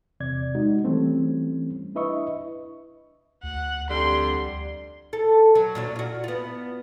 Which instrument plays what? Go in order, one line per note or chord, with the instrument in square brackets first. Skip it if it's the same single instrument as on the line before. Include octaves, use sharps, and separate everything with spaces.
[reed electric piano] E2 C3 D5 G#6
G#3 D#4 F#4
E3 G3 A3 C4 C#4
D4 E4 B4 D#5 E5 C#6
[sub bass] D2 [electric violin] F#5
[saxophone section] F2 D3 G3 [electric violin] C6
[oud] A4
F#3
A#2 F#3 D4
F4 F#4
B3 F4